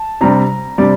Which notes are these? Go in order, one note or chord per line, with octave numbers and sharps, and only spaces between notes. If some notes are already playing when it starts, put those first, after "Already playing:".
Already playing: A5
C3 G3 D4 A#5
C3 G3 D4 D5